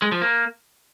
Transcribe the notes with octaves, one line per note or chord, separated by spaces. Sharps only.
G#3
F3
A#3